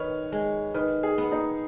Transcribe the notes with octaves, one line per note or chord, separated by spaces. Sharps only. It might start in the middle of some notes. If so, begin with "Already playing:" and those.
Already playing: D#3 B4 C#5
G#3
D#3 B4
G#4
B3
D#4